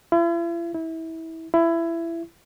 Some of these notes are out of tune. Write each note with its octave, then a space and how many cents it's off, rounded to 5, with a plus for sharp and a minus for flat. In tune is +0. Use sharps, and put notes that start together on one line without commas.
E4 +45
E4 -25
E4 +20